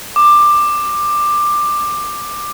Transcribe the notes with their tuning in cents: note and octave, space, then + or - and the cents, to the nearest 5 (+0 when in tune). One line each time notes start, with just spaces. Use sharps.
D6 +15